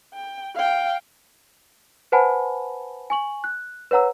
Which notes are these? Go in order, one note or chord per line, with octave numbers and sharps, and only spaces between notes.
G5
F5 G5
B4 C5 F#5 G#5 A5 B5
G#5 C#6 F#7
F#6
B4 C#5 F#5 A#5 E6